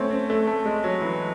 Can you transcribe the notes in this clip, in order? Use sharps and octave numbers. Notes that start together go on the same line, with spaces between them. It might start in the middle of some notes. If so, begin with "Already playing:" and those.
Already playing: A3 C4 C#4
C4
A3
A3
G#3
F#3
E3